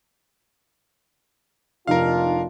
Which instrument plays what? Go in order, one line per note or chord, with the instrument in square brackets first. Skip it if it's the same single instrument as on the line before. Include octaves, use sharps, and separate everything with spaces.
[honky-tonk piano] F1 D#4 [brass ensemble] A#3 D4 F4 [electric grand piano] A#4 F5